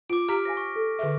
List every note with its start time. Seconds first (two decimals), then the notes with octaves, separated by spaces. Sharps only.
0.10 F4 D6 D7
0.29 G4 A#5 F6 B6 D7
0.45 C5 F5 G#5 A#6
0.57 C#6
0.76 A4
0.99 D3 G#4 E5